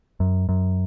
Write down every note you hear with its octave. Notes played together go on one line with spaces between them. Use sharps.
F#2
F#2